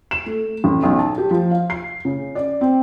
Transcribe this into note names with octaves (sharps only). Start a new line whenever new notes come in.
E7
A3
A1
B1
A5
G4
F3
F5
C7
C#3
D5
C4